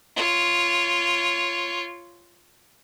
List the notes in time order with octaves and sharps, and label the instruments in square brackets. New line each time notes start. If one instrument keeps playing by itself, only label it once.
[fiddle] F4 C#5